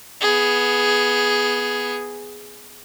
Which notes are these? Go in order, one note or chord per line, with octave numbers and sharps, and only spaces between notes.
B3 G#4